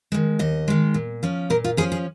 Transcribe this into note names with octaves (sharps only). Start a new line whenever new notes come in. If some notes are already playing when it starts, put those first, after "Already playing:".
D#3 G#3
D#2 D#5
D#3 G#3
A#2
F3 C#4
A#2 A#4
F4
F3 C#4 G#4
G#4